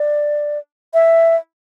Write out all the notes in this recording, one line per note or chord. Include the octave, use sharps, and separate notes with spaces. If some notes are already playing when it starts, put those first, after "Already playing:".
Already playing: D5
E5